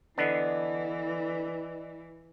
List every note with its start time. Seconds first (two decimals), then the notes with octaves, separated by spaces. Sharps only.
0.18 D3 E3 B3 D4 B4 D5 D#5